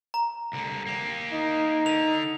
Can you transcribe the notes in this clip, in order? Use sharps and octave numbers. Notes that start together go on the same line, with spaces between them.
A#5
C2 D3
A#3 G4
D#4
D3 F7